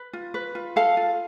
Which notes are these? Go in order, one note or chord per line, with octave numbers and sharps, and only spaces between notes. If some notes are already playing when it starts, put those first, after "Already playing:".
Already playing: B4
F4
B4
F4
A4 F5
F4